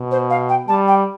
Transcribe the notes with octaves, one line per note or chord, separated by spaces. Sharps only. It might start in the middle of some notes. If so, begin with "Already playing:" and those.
Already playing: B2
C5
F5
G5
G3 A5
G5